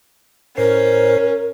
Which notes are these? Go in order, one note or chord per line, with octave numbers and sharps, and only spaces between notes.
A2 C#4 A#4 C5 C7